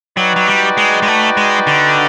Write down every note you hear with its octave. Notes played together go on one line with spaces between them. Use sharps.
F#3 D#4 F#4 B4 D5 G5
F#3
G3
G#3
G#3
A3
G#3
D3